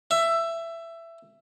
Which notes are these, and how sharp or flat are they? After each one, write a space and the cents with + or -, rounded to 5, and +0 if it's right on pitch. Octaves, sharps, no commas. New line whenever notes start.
E5 +15